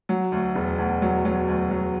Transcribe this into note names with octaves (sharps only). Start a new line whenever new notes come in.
F#3
D2
E1
D2
F#3
F#3
D2
F#3